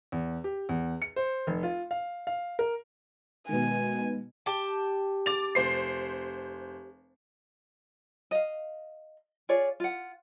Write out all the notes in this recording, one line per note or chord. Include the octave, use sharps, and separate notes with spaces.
E2
G4
E2
C#7
C5
F1
F4
F5
F5
A#4
B2 D#3 G#3 G#5
G4 A5
D6 A6 F7
F1 C5 C7
D#5 F5
F4 G#4 C#5 D5
F4 F#5